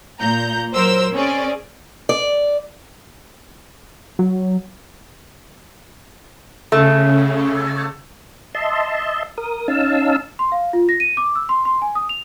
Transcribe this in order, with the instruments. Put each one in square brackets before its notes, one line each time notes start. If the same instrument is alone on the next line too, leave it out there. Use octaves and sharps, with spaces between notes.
[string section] A#2 A#5 G6
F#3 A#4 C5 E6
C4 C#4 G#4 D5
[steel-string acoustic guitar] D5
[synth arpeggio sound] F#3
[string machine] C#3 [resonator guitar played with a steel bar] A3
[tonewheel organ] D#5 E5 A5 C6
A#4 D#6
C#4 D#4 F5 A5 E6
[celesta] C6
F5
F4
A#6
D#7
D6
E6
C6
C6
G#5
D#6
F7